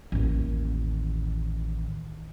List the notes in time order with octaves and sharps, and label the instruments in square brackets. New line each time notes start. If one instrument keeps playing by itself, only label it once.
[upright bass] A1 D#2